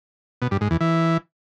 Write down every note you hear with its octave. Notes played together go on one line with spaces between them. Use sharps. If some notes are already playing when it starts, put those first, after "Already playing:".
B2
G2
G#2
E2
E3